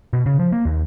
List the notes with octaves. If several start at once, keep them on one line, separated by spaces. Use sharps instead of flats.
B2
C#3
F3
A#3
D#2